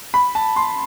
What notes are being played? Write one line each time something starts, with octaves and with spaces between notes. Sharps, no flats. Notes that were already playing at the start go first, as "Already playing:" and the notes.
B5
A5
C6